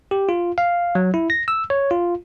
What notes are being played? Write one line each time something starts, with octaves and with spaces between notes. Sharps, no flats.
G4
F4
F5
F#3
E4
A#6
E6
C#5
F4